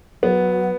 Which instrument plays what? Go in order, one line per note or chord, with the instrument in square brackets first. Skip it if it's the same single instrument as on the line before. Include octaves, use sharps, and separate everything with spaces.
[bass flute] F#3 [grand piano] B3